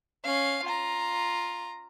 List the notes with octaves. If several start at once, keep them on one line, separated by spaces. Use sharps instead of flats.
C#4 F5
F4 A#5